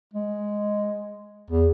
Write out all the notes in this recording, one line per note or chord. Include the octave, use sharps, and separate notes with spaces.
G#3
E2